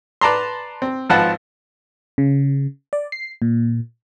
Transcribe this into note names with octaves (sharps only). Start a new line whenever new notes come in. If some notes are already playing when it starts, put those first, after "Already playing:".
B4 D5 A5 A#5 C6
C4
G#1 F3 F4 B4 F#5 A5
C#3
D5
C7
A#2